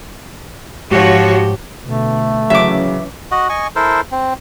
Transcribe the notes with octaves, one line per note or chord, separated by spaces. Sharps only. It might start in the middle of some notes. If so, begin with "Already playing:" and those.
G#2 F3 F#4 G4 C#5
B2 D3 A3
C#3 E3 F#3 C#4 E5 D6
F#4 D#5 F#5
D#5 G#5 C#6
E4 A4 A#4 C5
C4